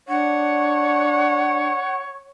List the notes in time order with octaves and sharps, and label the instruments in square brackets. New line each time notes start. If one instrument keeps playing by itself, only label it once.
[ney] D4 [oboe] C#5 [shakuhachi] F#5